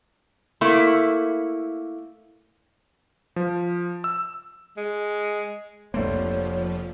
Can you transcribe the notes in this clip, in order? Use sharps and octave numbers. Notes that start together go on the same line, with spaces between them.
A3 A#3 E4
F3
E6
G#3
F1 F3 A3 A#3 D4 C5 C#5